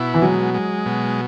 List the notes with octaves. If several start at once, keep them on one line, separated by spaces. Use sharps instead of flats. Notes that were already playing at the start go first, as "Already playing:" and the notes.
Already playing: B2 E4
E3
F#3 G#3
G#3
B2